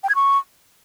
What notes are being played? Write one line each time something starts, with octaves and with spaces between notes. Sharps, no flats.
G5
G#6
C#6